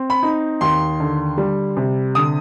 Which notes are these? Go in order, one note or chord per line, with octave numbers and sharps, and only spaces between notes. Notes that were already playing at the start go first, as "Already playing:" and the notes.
Already playing: C4
B5
D#4
D#2 C6
D3
G3
C3
D3 D#6